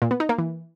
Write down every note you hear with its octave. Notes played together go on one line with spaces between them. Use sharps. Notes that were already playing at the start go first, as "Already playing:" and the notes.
A#2
B3
D#4
A#3
E3